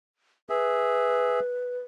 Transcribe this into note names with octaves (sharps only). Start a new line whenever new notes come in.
G#4 B4 E5